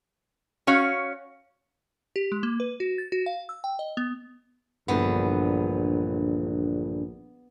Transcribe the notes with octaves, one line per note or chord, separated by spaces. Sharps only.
C#4 F#4 C#5 F5
G4
G#3
A#3
B4
F#4
A6
F#4
F5
E6
G5
D#5
B3
A#1 G2 D3 E3 B3